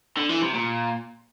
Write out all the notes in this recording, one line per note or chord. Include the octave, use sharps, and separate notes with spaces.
D3
E3
C3
A#2